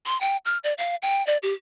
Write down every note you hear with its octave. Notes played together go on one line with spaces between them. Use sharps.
C6
G5
F6
D5
F5
G5
D5
G4